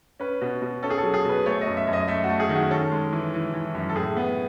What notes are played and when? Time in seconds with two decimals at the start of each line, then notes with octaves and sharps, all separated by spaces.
0.20 C#4 B4
0.41 B2
0.62 B2
0.83 C#4 A4
0.90 G#4
0.98 A4
1.03 F#3
1.14 G#4
1.25 B2 B4
1.46 A3 C#5
1.61 D#5
1.67 F#2
1.77 E5
1.87 F#2
1.93 D#5
2.08 A3 E5
2.24 F#4
2.29 A3
2.40 G#4
2.49 D#3
2.55 F#4
2.70 C#4 A4
2.91 G#3
3.13 E3
3.34 E3
3.54 E3
3.75 F#2
3.89 A4
3.96 A2 G#4
4.16 B3